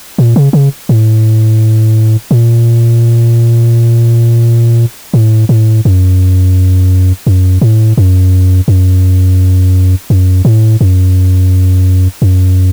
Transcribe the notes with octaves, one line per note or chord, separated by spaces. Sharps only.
A#2
C#3
C#3
A2
A#2
A2
A2
F#2
F#2
A2
F#2
F#2
F#2
A2
F#2
F#2